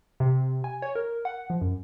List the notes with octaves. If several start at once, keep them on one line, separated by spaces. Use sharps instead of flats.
C3
G#5
C#5
A#4
F#5
F3
F#2